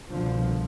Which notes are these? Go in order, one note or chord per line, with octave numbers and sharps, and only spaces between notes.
C2 B2 D3 F3